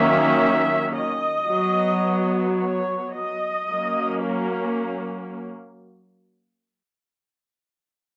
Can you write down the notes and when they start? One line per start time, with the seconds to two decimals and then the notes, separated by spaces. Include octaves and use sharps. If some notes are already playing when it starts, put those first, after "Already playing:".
Already playing: D#3 F#3 A#3 C#4 E5
0.95 D#5
1.49 F#3 B3
2.60 C#5
3.14 D#5
3.69 F#3 A#3 C#4
4.24 A#4